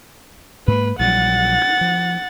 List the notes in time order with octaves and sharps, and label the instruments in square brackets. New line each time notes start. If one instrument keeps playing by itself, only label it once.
[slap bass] G#2 A#3 [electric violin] B4
[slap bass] A#1 F#3 G3 [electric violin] F#5 A6
[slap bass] F3